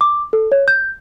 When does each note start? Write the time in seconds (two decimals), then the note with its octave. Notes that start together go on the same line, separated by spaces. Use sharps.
0.01 D6
0.33 A4
0.52 C#5
0.68 G6